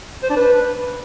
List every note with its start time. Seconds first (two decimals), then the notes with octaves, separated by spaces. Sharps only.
0.23 C5
0.30 D4
0.37 B4